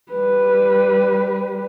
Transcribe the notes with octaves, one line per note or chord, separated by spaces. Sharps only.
G3 B4